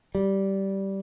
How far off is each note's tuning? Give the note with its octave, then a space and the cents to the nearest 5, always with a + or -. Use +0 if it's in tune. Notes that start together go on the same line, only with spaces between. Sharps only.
G3 -10